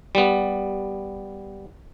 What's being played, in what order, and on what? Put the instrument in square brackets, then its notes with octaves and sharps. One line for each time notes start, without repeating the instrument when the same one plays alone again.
[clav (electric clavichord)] G3 B3